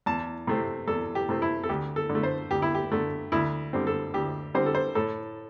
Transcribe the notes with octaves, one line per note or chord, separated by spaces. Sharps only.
E2 A5
C3 A3 C4
E2 A4
G4
C3 A3 C4
E4
A4
D2 G4
A4
D3
A3
C5
D2 G4
E4
G4
D3 A3
D2 E4
D3 G3 C4
A4
D2 G4
D3 G3 C4 C5
A4
C5
A2 A4